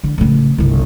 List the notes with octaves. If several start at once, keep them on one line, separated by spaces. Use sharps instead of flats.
D3
A2 C#3
G1 C2